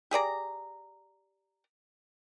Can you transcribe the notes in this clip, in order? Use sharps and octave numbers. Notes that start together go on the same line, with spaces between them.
G4 G#4 D5 A#5